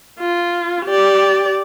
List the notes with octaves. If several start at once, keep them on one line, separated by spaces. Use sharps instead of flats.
F4
G4 D5